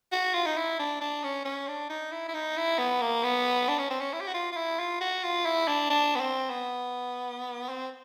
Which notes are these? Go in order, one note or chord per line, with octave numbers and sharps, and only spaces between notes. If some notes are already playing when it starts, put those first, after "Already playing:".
F#4
F4
D#4
E4
D4
D4
C#4
C#4
D4
D#4
E4
E4
D#4
E4
B3
A#3
B3
D4
C#4
C4
C#4
E4
G4
F#4
F4
F4
E4
F4
F#4
F4
E4
D4
D4
B3
C4
B3
C4